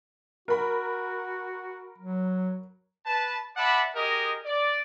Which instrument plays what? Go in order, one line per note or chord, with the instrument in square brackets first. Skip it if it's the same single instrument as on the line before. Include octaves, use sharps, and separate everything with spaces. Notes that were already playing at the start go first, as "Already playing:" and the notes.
[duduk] F#4 [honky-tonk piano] A#4 B5
[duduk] F#3
[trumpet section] B4 A5
D5 E5 F#5 A5 B5
G4 G#4 A#4 D#5
D5